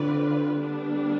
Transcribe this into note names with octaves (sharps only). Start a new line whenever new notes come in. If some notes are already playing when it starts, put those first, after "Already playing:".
Already playing: D3 C4 F4 B4 D5
G3 B3 D4